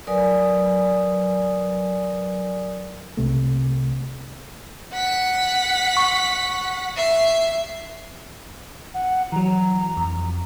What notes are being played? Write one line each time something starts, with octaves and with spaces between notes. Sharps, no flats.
F#3 A#4 B4 D5 G#5 D#6
C2 C3 A3
F#5 B6
C#6
E5 C7
F#5
E3 F#3 A#5
F2